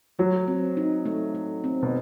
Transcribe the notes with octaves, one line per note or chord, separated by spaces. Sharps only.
F#3 A3
C4
D#4
A3
A3
C4
B2